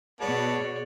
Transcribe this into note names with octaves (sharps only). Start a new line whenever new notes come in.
B2 B3 F#4 G#4 C#5 D5 A5